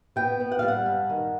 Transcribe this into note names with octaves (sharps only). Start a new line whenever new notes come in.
B3 G5
B3
F#5
F5
G3
F#5
G2
D#3